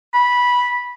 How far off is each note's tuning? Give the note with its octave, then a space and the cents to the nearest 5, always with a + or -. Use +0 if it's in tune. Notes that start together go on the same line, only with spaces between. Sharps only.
B5 -10